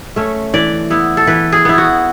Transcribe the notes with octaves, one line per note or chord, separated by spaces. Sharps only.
A3 C#4
E3 D5
B3 E4
A4
E3 B4
G#4
B3 E4
F#4